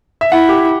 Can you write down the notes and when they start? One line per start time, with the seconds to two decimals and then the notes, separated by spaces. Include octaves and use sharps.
0.21 E5
0.31 E4 F#5
0.49 G4